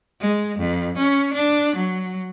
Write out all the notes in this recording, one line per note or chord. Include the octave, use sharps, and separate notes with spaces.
G#3
F2
C#4
D4
F#3